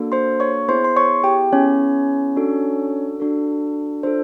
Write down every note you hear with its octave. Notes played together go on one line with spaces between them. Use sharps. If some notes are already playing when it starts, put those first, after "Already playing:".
Already playing: A#3 D4 F#4 A4
C5 C6
C#5 C#6
B3 E4 G#4 C5 C6
C6
C#5 C#6
G4 G5
B3 C#4 E4 G#4 C#5
D4 F#4 A4
D4 F#4 A4
D4 F4 A4 C5